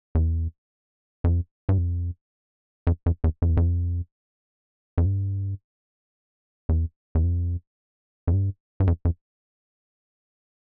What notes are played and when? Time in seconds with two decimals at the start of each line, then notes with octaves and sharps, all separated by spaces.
0.15 E2
1.24 F2
1.69 G2
1.78 F2
2.87 F2
3.06 F2
3.24 E2
3.42 F2
3.49 E2
3.57 F2
4.98 F2
5.05 G2
6.69 E2
7.15 E2
7.24 F2
8.27 F2
8.33 G2
8.80 G2
8.87 F2
9.05 F2